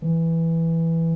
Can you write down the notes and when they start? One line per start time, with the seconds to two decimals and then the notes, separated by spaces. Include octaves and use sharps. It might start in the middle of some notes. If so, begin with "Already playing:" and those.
0.02 E3